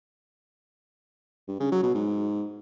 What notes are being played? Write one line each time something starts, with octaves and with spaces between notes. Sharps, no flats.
G2
C#3
F#3
B2
G#2